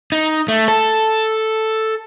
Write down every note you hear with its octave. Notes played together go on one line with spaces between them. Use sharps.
D#4
A3
A4